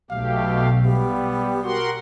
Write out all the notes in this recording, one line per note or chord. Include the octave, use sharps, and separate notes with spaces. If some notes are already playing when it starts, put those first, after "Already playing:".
B1 B2 A3 G4 F5
G3 B3 G4
F#4 A#4 F#5 C6